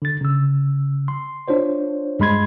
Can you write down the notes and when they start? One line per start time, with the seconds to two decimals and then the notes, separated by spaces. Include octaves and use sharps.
0.02 D3 A6
0.21 C#3 E6
1.08 C6
1.48 D4 F4 C5 C#5
2.19 G2 G#3 B5 C6 G#6